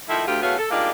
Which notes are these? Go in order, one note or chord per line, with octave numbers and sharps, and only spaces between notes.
D#3 F3 A3 D#4 E4
D2 F4 G4
E2 A3 B3 C#4 F#4 F5
A4
G3 G#3 A#3 D4 D#4 F4